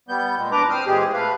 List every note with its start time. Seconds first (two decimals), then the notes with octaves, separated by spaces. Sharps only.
0.09 G3 B3 G6
0.37 A#2 G#3
0.52 E2 D4 B4 A#5 D6
0.70 C4 C5 D#6 F6
0.86 A#2 E3 G#3 C4 G4 G#4
1.14 A3 B4 F5